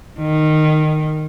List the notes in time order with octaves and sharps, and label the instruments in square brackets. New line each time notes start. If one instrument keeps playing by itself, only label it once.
[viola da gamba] D#3